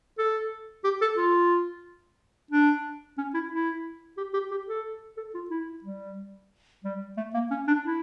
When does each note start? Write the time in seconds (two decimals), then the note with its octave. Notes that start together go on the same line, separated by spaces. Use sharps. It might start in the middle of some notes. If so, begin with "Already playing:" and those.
0.18 A4
0.84 G4
1.01 A4
1.17 F4
2.51 D4
3.18 C#4
3.34 E4
3.51 E4
4.17 G4
4.34 G4
4.51 G4
4.67 A4
5.17 A4
5.35 F4
5.50 E4
5.84 G3
6.84 G3
7.17 A3
7.34 A#3
7.51 C#4
7.67 D4
7.84 E4